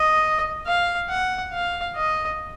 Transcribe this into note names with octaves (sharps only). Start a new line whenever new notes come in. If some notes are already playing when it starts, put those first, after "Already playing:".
Already playing: D#5
F5
F#5
F5
D#5